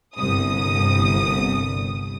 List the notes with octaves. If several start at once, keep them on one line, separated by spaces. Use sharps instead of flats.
G1 C2 D#6